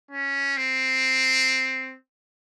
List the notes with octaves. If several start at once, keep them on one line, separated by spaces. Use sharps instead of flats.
C#4
C4